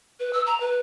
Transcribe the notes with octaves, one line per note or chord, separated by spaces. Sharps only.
B4
E6
A#5
B4